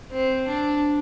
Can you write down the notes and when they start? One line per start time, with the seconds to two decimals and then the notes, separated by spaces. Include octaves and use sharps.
0.12 C4
0.47 D4